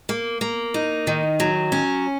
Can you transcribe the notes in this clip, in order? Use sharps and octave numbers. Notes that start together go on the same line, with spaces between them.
A#3
A#3
D#4
D#3
F#3
C#4